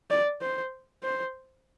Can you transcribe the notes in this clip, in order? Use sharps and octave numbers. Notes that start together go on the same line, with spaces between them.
D5
C5
C5